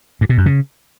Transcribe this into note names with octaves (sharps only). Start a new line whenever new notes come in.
G2
B2
F#2
C#3